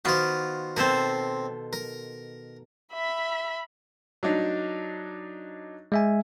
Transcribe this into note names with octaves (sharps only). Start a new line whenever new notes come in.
D#3 B3 F4 F#4 C5
B2 C4 A4 A#4 C5
A#4
E5 B5
F#3 D4 D#4
G#3 E5 G#5